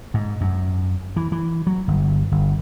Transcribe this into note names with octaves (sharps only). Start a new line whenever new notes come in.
G#2
F#2
E3
E3
F#3
G1
G1